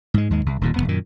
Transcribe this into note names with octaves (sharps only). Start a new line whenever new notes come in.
G#2 G#3
D#2 G#2 G#3
C2
D#1 D#2 A#2
E1 F2 B3
F#2 A#2 D#3